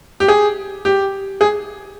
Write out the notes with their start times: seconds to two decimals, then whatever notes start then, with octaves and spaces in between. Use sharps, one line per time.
0.20 G4
0.28 G#4
0.85 G4
1.41 G#4